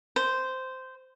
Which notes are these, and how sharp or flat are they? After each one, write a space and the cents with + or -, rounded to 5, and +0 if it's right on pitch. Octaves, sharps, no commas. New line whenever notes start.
C5 -10